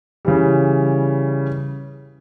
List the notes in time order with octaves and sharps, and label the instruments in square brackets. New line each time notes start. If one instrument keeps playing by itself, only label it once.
[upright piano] C#3 E3 G3